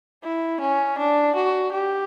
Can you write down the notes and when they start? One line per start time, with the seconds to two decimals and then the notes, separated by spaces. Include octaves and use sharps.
0.24 E4
0.61 C#4
0.98 D4
1.36 F#4
1.72 G4